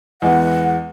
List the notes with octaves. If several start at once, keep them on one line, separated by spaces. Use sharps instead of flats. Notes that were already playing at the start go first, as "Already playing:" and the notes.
E2 G#3 B3 F#5